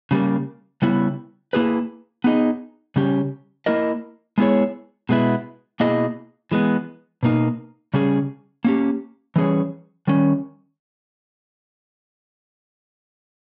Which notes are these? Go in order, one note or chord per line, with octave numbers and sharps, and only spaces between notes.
C#3 G3 A#3
C#3 G3 B3 E4
A#3 E4 G#4 B4
B3 D#4 G#4 D#5
C#3 G3 C#4 G4
A#3 E4 A#4 D#5
G#3 B3 E4 G#4 C#5
B2 G#3 B3 E4
B2 A#3 E4 G#4 D#5
E3 G#3 B3
B2 A#3 D#4
C#3 G3 C#4 G#4
A#3 C#4 G4
E3 G3 C#4 G#4 C#5
D#3 G3 C#4